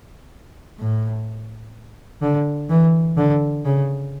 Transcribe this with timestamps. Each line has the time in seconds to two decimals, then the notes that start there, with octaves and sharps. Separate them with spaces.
0.80 A2
2.22 D3
2.70 E3
3.17 D3
3.65 C#3